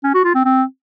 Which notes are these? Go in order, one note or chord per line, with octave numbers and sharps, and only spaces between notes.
C#4
F#4
F4
C4
C4